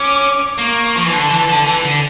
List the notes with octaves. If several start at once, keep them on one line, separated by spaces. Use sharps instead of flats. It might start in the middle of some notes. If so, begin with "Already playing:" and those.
Already playing: C#4 D6
A#3 C#6
F3
E3
D3 A5
E3
D3
E3
D3